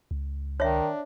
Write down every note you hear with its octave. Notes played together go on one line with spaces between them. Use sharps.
C#2
D#3 D4 C#5 E5